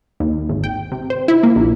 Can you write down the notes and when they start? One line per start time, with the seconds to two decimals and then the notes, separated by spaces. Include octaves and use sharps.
0.20 D#2
0.49 G#1
0.64 G5
0.92 C3
1.10 C5
1.28 E4
1.43 A#3
1.56 A#1